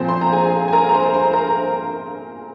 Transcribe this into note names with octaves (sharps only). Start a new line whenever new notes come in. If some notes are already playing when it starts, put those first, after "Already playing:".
Already playing: A#2 F3 C4 C5
C6
A#5
G#4 G#5
G#5
A#4 A#5
A#5
C5 C6
A#5
C5 C6
A#4 A#5